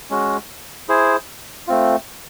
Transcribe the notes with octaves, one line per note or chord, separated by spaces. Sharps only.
G#3 C#4 F#4
E4 G#4 C5
A3 C4 F4